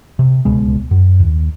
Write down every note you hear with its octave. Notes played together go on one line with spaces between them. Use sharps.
C3
D1 C#2 B2 G#3
F#2
D#2